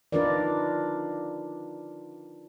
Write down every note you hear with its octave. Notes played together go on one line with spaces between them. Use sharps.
D4 D#4 F4 A#4 B4 D5